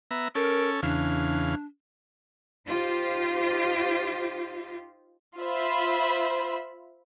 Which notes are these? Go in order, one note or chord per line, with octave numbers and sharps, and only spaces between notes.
B3 E5 A#5
C#4 A4 A#4
E2 C#3 D4 F5
D#4 F4 G4 C5
F4 C5 E5 B5